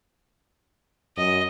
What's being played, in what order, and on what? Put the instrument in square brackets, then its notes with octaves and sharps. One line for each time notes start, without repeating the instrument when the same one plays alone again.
[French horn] F#2 [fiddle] D#5